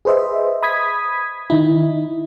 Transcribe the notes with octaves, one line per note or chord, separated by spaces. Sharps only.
G#4 B4 C5 D#5 E5
B5 D#6 G#6 B6
D#3 D#4 E4